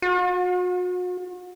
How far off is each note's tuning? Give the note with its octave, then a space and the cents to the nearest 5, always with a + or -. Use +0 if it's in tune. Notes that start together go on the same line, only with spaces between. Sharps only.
F#4 -40